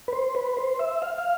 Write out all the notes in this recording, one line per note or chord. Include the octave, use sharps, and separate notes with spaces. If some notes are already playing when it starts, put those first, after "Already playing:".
B4
C5
B4
C5
E5
F5
F5